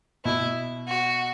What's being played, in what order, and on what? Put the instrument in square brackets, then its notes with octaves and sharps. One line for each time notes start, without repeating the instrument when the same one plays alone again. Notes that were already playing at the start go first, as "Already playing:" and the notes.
[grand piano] B2 [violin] E4
[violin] F#4